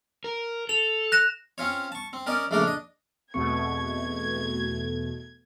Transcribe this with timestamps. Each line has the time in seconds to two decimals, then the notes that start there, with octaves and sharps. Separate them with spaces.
0.24 A#4
0.69 A4 F7
1.12 F#6 A#6 E7
1.58 C4 C#4 F4 C#5
1.92 A5 C#6
2.13 C4
2.26 C#4 A#4 D5 D#5
2.51 A#1 C#3 A3 D4 A#4 D5
2.63 D4 D#5
3.34 E2 B2 A3 C4 C#6 G#6 C#7